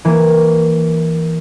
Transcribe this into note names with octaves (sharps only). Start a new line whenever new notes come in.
E3 A#3